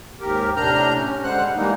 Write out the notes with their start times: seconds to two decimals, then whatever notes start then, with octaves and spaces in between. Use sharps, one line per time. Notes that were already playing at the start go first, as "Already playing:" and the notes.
0.21 D#2 G#2 G4 A#4
0.56 A2 C3 D4 A#5 F6 G6
0.95 C#4
1.24 D3 G3 G#3 C5 F#5 F#6
1.55 E3 G3 G#3 A#3 D#4